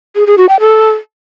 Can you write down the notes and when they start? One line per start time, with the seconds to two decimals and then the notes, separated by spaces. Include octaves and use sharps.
0.16 G#4
0.27 G#4
0.38 F#4
0.49 G5
0.60 A4